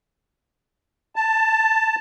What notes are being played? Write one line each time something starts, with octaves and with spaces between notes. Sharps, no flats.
A5